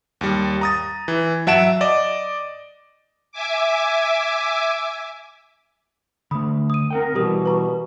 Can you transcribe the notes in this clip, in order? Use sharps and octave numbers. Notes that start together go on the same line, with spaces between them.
D#2 G3
A#5 D#6 A6
E3
F#3 E5 F#5 A5 D7 E7
D5 D#5 D6
E5 G#5 D6
D3 A3 B5 D#6
D#6 D#7
C4 A#4 F#5 G5
B2 E3 G3 G4 A#4 D#6
B4 A#5 C#6